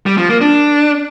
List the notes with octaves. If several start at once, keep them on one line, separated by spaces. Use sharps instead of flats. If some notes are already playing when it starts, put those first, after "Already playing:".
G3
F3
A#3
D4